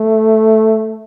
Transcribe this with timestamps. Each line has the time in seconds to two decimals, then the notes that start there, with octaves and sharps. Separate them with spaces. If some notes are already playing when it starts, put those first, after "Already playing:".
Already playing: A3